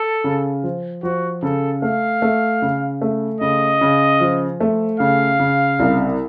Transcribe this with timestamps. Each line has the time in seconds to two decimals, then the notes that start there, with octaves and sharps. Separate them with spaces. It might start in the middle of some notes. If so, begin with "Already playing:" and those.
Already playing: A4
0.24 C#3
0.63 F3
1.03 F3 F#4
1.43 C#3 A4
1.82 A3 F5
2.22 A3
2.62 C#3
3.01 A3
3.41 C#3 D#5
3.81 C#3
4.20 F3
4.60 A3
5.00 C#3 F5
5.40 C#3
5.79 C2